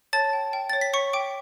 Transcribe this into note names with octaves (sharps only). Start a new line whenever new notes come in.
C#5 A5 A6
G5
G5
C#5 A6
B6
C#5 C#6 C#7
G5 D6 D7